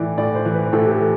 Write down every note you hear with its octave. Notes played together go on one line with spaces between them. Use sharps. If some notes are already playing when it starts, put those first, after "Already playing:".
Already playing: A2 E3 D5
A2 D5
C5
E3
B4
A2 A4
G4
A4
E3